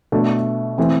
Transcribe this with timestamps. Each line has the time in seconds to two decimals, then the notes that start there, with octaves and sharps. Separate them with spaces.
0.12 B2 A3 D4
0.78 E3 A3 C4